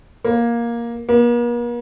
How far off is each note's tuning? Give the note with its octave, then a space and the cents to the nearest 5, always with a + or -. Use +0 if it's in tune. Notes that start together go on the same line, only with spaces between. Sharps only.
A#3 +10
A#3 +45